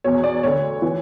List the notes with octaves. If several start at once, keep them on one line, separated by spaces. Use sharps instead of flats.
E2 B2 C#5
D5
D2 D3 C#5
E3